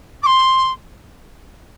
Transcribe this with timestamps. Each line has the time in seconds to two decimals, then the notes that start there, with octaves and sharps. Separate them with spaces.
0.22 D6
0.26 C6